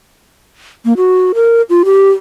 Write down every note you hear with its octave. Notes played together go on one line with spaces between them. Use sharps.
A#3
F#4
A#4
F4
G4